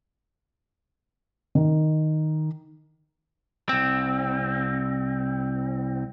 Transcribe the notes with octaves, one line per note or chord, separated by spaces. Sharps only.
D#3
C2 C4